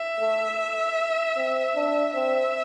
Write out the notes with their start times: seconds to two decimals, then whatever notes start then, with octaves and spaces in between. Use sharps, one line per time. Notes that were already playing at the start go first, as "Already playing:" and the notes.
Already playing: E5
0.20 A3
1.36 C4
1.76 D4
2.14 C4 E5